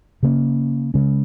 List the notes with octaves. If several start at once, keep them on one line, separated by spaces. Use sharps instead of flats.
C#3 A#3 C#4
C#3 G#3 C#4